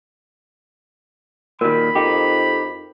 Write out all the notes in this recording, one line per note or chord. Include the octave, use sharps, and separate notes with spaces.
A#2 D#3 F#4 A#4 B5
F2 D#4 G4